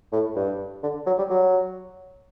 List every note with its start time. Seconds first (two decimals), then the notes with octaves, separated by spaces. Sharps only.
0.12 A2
0.36 G2
0.83 D3
1.07 F#3
1.19 G3
1.30 F#3